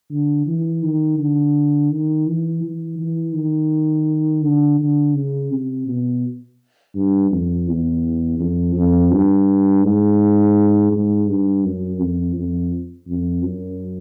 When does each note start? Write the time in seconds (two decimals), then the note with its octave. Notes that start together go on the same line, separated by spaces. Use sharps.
0.11 D3
0.47 E3
0.83 D#3
1.18 D3
1.90 D#3
2.26 E3
2.63 E3
2.99 E3
3.34 D#3
4.43 D3
4.79 D3
5.15 C#3
5.51 C3
5.88 B2
6.95 G2
7.32 F2
7.67 E2
8.39 F2
8.75 F2
9.12 G2
9.83 G#2
10.92 G#2
11.27 G2
11.64 F#2
12.00 F2
12.36 F2
13.08 F2
13.43 F#2